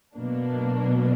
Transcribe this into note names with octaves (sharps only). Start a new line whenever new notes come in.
B2 F#3 A#3 D4